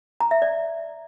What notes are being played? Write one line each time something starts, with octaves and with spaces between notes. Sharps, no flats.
A#5
E5
D5